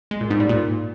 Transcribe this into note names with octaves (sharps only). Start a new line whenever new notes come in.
G#3
A#2
G#2
G3
A#2